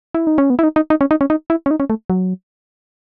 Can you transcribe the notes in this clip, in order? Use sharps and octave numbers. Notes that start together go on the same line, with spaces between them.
E4
D#4
C#4
B3
E4
D#4
D#4
D#4
C#4
D#4
C#4
D#4
E4
C#4
D#4
C#4
A3
F#3